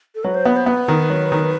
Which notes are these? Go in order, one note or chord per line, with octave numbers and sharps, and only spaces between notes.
A4
F#3 B4
C5
B3 B4
C5
B3 B4
D#3
F#3
D#3